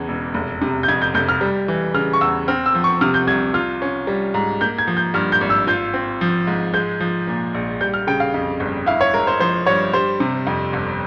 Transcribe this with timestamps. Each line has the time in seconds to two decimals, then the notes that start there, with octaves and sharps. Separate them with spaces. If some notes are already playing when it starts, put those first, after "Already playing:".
Already playing: E2 C#3 E3
0.08 E1
0.34 F1
0.62 C3
0.83 G6
0.88 F2 G#6
1.02 G6
1.14 F1 G6
1.29 F6
1.41 G3
1.68 E3
1.94 C#3 F6
2.13 C#6
2.21 E2 E6
2.48 C4 F6
2.66 E6
2.75 F3
2.84 C#6
3.01 C3 F6
3.14 G6
3.27 C2 G#6
3.54 F4 F6
3.82 C#4
4.07 G3
4.34 G#2
4.61 A#3 G6
4.78 G#6
4.87 F3
4.97 G6
5.14 G2 F6
5.32 G6
5.41 G#1
5.50 E6
5.67 F4 G6
5.94 C4
6.21 F3
6.47 G#2
6.74 G#3 G6
7.00 F3
7.27 A#2
7.54 A#1
7.81 G3 G6
7.94 F6
8.07 C#3 G5
8.20 F5
8.34 F2
8.60 G1
8.86 E4 F5
9.01 C#5
9.13 G#3 A#4
9.27 C5
9.40 F3 C5
9.66 G2 C#5
9.93 G3 C5
10.20 C3
10.47 F2
10.73 G1